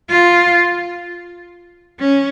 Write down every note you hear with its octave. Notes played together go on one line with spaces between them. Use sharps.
F4
C#4